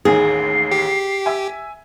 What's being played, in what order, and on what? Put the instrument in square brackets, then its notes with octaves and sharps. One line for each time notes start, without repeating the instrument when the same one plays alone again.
[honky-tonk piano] A1 D#2 D#3 [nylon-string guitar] G#4 [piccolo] C7
[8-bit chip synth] G4
[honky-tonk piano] E5 G#5